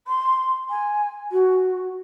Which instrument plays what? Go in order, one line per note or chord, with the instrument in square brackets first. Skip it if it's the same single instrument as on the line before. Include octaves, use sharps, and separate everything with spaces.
[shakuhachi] C6
G#5
F#4